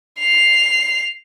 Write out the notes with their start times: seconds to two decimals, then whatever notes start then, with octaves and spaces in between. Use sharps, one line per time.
0.19 C7 F7